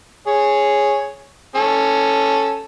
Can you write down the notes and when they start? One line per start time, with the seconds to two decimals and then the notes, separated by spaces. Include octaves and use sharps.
0.27 G#4 C#5
1.56 C#4 A4